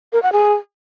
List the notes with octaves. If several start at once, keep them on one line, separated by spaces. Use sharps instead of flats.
A#4
F#5
G#4